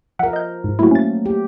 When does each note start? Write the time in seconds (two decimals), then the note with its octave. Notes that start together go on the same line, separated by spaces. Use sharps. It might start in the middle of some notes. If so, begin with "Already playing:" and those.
0.19 F3 A#4 E5 F#5
0.33 D#5 G6
0.64 G#2
0.79 F#3 A3 A#3 E4 F#4
0.91 C#4 A6
1.26 G4